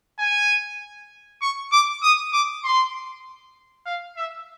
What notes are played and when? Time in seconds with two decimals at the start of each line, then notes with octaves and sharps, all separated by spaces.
0.19 G#5
1.42 C#6
1.72 D6
2.03 D#6
2.33 D6
2.64 C6
3.86 F5
4.17 E5